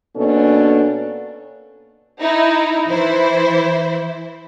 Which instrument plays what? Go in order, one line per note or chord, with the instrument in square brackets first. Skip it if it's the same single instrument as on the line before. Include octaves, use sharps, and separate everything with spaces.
[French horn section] B2 A#3 C#4 D4 A4
[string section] D#4 E4
E3 E4 C5